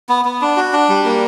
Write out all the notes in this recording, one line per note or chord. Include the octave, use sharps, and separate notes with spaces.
B3
B3
D4
F#4
D4
G3
A#3